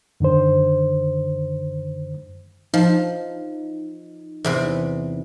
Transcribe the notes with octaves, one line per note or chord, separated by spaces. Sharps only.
F#2 D3 D#3 C5
F3 D#4
E2 C3 B4